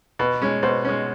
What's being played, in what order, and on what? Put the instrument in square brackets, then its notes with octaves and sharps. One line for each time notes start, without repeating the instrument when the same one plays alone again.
[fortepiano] B2 [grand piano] B4
[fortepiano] G#3 C#4
[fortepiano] B2 [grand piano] C5
[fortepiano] G#3 C#4